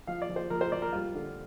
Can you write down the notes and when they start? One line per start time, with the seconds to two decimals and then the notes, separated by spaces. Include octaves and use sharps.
0.07 F3 F5
0.22 D5
0.29 F3
0.36 C5
0.50 F3 A#4
0.61 C5
0.72 F3 D5
0.82 A#4
0.92 G3 F4
1.14 D3